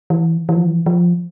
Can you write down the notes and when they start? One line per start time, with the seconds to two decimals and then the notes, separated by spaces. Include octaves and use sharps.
0.10 E3
0.49 E3
0.56 F3
0.67 E3
0.86 F3